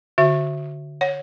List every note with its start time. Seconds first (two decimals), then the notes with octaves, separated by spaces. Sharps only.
0.18 D3 F#4 E5
1.01 C#5 F#5